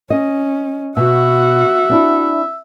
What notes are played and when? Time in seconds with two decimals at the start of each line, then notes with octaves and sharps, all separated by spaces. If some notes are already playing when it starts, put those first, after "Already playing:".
0.10 C#4 D#5
0.97 B2 F#4 E5 F#5
1.90 C4 D4 E4